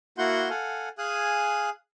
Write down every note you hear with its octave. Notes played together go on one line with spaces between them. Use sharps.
A#3 E4 F#4 F#5 C6 G6
A4 F5 F#5 G#5
G#4 F5 G#5 D#6 F#6